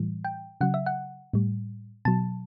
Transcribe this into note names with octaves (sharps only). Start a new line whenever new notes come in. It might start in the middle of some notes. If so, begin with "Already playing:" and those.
Already playing: A2 E3 G3
G5
C#3 F#3 F#5
E5
F#5
A2 G3
B2 F#3 A5